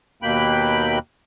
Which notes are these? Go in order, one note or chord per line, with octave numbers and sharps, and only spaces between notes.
D#2 B2 A#3 G5 B5 F#6